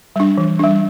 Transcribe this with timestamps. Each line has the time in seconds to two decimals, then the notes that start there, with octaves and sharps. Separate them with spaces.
0.16 G3 D4
0.38 E3
0.59 G3 D4